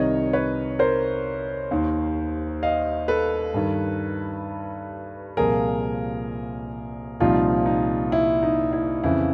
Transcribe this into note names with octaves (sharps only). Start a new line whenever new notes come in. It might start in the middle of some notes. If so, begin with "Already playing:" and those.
Already playing: C2 C3 D#3 C#5 D#5
B4 C#5
A#4 C5
D#2 D#3
D#5 F5
A4 B4
G2 D#3
C2 A#2 F3 G#4 A#4
C2 A#2 F3 D#4 F4
D#4
E4
D#4
E4
F2 C#3 E3 E4